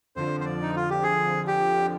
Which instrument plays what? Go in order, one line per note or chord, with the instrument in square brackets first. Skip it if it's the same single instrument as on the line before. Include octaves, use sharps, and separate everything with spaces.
[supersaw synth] F2 D3 F3 [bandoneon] C5
[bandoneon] C5
D5
D#4
F4
G4
G#4
G4